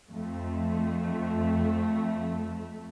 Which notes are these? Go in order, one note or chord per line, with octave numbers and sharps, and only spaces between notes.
F2 A3